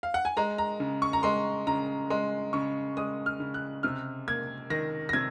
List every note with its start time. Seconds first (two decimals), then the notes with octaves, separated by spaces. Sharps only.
0.03 F5
0.14 F#5
0.25 G#5
0.37 G#3 A#5
0.58 A#5
0.80 C#3
1.02 C#6
1.13 A#5
1.23 G#3 C6
1.67 C#3 A#5
2.10 G#3 C6
2.53 C#3 C#6
2.97 G#3 D#6
3.26 F6
3.40 C#3
3.54 F#6
3.83 C3 F6
4.28 A#3 G#6
4.70 D#3 A#6
5.09 A#6
5.13 C3 G#6